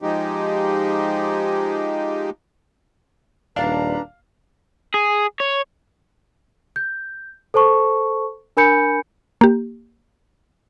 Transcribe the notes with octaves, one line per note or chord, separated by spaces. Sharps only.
F3 G#3 D#4 G4
D#1 D4 B4 F5 A#5
G#4
C#5
G6
A4 C5 A5 C#6
D4 A#4 G#5 B5 G6 C#7
A#3 G4